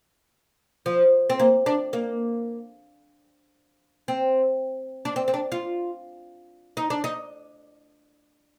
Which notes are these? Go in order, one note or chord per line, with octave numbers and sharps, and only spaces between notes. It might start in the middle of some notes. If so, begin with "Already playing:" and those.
F3
C4
A#3
D4
A#3
C4
D4
C4
C4
D4
F4
D#4
D4
D#4